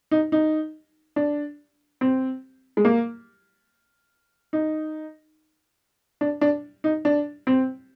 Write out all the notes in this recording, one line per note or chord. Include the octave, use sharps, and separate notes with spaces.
D#4
D#4
D4
C4
G#3
A#3
D#4
D4
D4
D#4
D4
C4